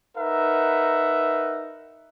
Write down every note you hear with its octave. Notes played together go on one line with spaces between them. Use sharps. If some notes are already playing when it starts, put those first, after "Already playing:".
D#4 A#4 B4 E5 F#5